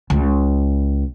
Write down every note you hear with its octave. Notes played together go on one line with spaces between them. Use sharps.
C#2